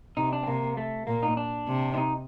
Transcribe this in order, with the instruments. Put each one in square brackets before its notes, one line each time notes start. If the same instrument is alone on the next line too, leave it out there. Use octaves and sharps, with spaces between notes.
[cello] C3 [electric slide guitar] D#4
[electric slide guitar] D4
C4
[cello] C3 [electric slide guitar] A#3
[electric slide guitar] A3
[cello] A#2 [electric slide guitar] A#3
[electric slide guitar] D#4
D4
[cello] C3
[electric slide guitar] D4
D#4